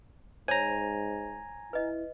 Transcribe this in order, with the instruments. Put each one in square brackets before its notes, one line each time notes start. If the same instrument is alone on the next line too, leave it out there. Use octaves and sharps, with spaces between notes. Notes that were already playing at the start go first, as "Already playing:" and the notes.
[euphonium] G#2 [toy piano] C5 C#5 [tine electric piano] G#5 A#5
[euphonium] E4 [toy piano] B4 D#5